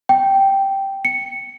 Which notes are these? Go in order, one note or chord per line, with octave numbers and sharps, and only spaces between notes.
G5
C#7